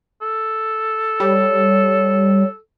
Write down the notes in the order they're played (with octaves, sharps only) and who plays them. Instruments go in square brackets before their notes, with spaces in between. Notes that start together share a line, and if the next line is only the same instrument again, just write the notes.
[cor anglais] A4
[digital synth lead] G3 [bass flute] C#5